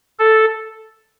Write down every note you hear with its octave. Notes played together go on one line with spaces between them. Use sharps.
A4